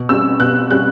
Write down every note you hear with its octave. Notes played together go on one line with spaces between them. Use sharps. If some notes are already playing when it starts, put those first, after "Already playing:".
Already playing: B2
G3 C#4 E6
B2 F#6
G3 C#4 F#6